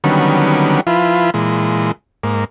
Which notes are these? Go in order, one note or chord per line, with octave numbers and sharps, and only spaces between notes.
D3 D#3 F#3 G3 B3 C#4
F3 E4 F4 B4
A#2 E3 G#3
G#2 A#3